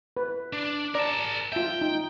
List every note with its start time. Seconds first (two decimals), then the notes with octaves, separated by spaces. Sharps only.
0.17 B4
0.53 D4
0.95 A#4 D5 A5
1.53 F4 E5 G5
1.81 D#4